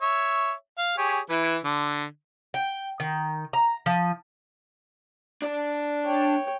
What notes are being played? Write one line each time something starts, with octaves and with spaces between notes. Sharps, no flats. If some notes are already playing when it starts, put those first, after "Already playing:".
C#5 E5
F5
G4 G#4 C#5
E3 E4 B4
D3
G5
D#3
A#5
F3
D4 D5
C#5 G5